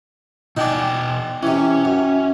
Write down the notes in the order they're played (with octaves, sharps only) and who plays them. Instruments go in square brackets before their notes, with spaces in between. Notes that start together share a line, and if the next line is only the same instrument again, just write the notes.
[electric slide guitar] B2 G5 G#5 [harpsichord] D4 D#4
[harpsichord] C3 E3 [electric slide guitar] C#4
[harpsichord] F#2